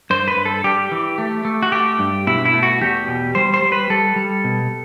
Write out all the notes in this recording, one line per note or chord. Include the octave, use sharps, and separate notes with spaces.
G2 C5
B4
G2
A4
G3 G4
E3
A3
A3
F#4
A3 G4
G2
B2 E4
E4
A3
F#4
E2 G4
B2
G3 C5
C5
G3
B4
G3 A4
G3
B2